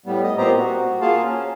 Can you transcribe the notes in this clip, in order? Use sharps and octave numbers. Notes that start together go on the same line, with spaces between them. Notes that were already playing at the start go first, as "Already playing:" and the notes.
A2 G3 B3
D#5
A#2 B3 C4 G4 C5 A#5
F#4
A#3 F4 G#4 F5 A5
C#4